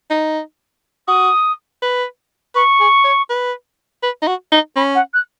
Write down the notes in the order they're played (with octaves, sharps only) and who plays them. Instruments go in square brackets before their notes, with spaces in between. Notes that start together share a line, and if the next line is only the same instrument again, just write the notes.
[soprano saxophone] D#4
[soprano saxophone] F#4 [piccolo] D#6
[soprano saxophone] B4
[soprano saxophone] B4 [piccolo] C#6
[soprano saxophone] G#4
C#5
B4
B4
D#4
F#4
D#4
[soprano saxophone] C#4 [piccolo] B5
[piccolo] F#5
F#6